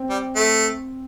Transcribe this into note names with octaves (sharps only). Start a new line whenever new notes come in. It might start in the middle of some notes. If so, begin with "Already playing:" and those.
Already playing: C4
G3
A3